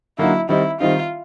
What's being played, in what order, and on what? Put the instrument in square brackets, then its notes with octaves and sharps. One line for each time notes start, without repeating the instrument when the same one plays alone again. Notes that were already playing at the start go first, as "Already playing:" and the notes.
[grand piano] D3 F#3 A#3 D#4 F#4 [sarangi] E4
[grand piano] D#3 G3 C4 D#4 [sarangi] E4
[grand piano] D#3 G3 C4 D#4 [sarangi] F4